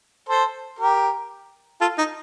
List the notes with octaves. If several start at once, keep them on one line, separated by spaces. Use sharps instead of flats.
A4 C5
G4 A#4
F4 A4
D#4